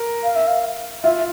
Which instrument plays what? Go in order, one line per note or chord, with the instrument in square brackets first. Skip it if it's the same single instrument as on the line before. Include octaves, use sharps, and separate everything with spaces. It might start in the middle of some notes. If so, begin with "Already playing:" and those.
Already playing: [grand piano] A#4
[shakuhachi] F5
E5
F5
[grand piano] F4 [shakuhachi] E5